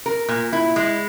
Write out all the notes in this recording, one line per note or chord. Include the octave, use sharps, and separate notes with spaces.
A#4
A#2
E4
G#3